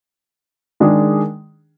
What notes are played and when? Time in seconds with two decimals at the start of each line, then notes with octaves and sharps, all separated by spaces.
0.80 D#3 G#3 D4 G#4